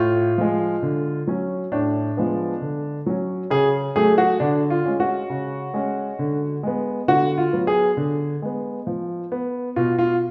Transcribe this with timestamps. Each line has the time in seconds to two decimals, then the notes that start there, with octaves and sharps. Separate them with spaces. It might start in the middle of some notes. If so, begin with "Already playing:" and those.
Already playing: A2 F4
0.38 F3 G#3
0.82 D3
1.27 F#3 C#4
1.72 A2 D4
2.17 F3 G#3 B3
2.61 D3
3.06 F#3 C#4
3.50 C#3 G#4
3.96 F#3 A3 G#4
4.18 F#4
4.40 D3 D4
4.70 F4
4.85 G#3 C#4
5.00 F#4
5.30 C#3
5.74 G#3 C#4
6.19 D3
6.63 G#3 B3
7.08 D3 F#4
7.38 F4
7.53 F#3 B3
7.67 G#4
7.97 D3
8.42 G#3 B3
8.87 F3
9.32 B3
9.76 B2 F4
9.99 F4